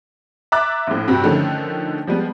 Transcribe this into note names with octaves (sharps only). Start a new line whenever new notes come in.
E5 A#5 D6 F#6 A6
A#1 A2
G2 C3 C4 F#4 G4
D3 D#3 F3 A3 C#4
F3 G3 G#3 B3